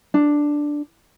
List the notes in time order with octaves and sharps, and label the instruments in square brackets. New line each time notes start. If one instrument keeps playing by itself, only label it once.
[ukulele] D4